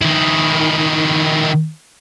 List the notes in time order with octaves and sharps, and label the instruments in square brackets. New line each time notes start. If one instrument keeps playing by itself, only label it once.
[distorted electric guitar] D#3 E4